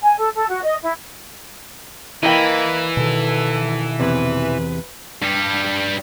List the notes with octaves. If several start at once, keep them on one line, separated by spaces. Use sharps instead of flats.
G#5
A4
A4
F#4
D#5
E4
E3 A#3 E4 D#5 G5 B5
B2 D#3 A4
E2 C3 B4
G2 G3